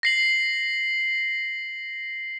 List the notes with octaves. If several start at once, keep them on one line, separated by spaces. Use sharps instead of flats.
A#6 C7 F#7